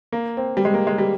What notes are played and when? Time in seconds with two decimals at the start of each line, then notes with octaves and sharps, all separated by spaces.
0.12 A#3
0.37 C4
0.57 G3
0.65 G#3
0.74 A#3
0.87 G#3
0.98 G3